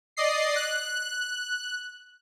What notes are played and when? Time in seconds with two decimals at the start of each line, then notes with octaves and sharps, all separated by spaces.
0.17 D5 D#5 C7
0.56 F#6